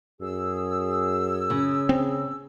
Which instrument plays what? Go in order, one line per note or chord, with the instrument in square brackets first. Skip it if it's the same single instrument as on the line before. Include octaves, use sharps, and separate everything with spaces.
[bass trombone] F#2 [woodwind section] G#4 E6
[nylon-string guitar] C#3
[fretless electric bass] C4